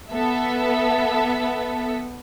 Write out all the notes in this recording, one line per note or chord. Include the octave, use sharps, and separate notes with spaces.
B3 A4 E5